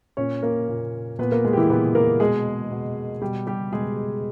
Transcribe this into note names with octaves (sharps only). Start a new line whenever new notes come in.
A#2 C#4 C#5
A#3 A#4
A#2
A#2 B3 B4
A#3 A#4
G#3 G#4
G4
E3 E4
A#2 B3
A#3 A#4
B2 G#3 G#4
B2
B2 G3 G4
G3 G4
B2 G#3 G#4